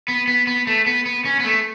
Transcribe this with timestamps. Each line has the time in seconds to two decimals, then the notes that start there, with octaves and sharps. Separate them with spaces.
0.08 B3
0.28 B3
0.47 B3
0.67 A3
0.86 B3
1.06 B3
1.25 C#4
1.40 B3
1.45 A3